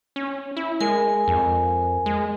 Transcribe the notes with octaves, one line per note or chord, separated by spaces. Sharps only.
C#4
E4
G#3 A#4 G#5
F2
G#3